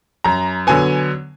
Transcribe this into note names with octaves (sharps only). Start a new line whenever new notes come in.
F#2 A#5
D3 F#3 B3 G#5